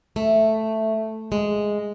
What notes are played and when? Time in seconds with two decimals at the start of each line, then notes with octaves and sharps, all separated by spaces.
0.16 A3
1.32 G#3